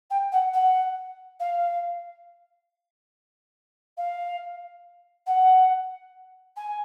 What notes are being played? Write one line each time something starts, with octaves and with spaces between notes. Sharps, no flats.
G5
F#5
F#5
F5
F5
F#5
G#5